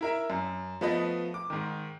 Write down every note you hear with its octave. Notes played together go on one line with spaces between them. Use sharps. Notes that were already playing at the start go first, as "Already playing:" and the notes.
E4 A#4 E5
F#2
F3 A3 B3 B4 D#5
D6
G#2 D#3